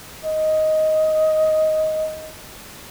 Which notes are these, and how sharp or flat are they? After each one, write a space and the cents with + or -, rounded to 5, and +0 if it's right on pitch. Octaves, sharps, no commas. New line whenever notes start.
D#5 +5